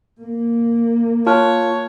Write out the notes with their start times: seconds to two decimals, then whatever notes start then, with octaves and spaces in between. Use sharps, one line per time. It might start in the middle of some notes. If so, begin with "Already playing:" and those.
0.21 A#3
1.27 F4 C#5 A5 F6 F#6